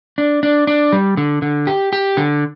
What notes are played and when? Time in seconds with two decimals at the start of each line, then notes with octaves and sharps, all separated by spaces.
0.18 D4
0.43 D4
0.67 D4
0.93 G3
1.17 D3
1.42 D3
1.67 G4
1.93 G4
2.17 D3